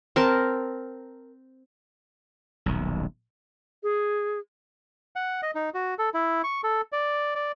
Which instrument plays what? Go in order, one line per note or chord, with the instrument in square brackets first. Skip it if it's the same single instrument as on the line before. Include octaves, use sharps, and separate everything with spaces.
[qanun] C4 A#4 A5
[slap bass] D#1 B1
[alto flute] G#4
[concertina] F#5
D#5
D#4
F#4
A4
E4
C#6
A4
D5
D5